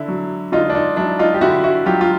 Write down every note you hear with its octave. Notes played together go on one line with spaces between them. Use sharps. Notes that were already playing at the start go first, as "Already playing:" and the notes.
Already playing: D3 E4
F#3
D3 D#4 F4
D4
D#4
F#3 D4 E4
D#4 F4
G4
D3 E4 F#4
E4 F#4
F#3 F4 G4
F4